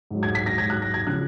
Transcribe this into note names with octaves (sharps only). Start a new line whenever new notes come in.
G#2 F#3
G#6
B6
A#6
G#2 F#3 G#6
F#6
A#6
G#6
C#3 F3 F#6